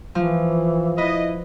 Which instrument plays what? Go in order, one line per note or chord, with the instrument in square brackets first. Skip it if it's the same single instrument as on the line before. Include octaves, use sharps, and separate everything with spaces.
[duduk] E3 [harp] F3
[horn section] E4 D#5 [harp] B4